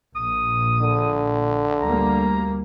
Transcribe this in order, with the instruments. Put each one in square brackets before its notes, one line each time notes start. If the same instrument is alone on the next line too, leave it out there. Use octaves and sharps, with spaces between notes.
[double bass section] A#1 A#2 [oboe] D#6
[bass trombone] D3
[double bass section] D2 G3 A#3 [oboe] A#5